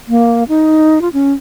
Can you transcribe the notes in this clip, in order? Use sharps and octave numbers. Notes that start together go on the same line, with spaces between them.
A#3
D#4
F4
C#4